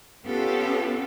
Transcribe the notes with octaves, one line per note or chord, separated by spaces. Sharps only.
B3 C#4 F4 G4 A4